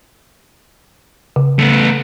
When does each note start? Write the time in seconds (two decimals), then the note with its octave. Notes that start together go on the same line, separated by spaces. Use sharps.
1.36 C#3
1.59 A3 B3